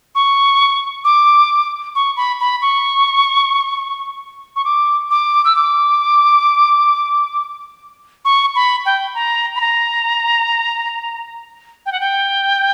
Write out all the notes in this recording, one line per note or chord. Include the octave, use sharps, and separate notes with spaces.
C#6
D6
C#6
B5
B5
C#6
C#6
D6
D6
E6
D6
C#6
B5
G5
A#5
B5
A#5
G5
F#5
G5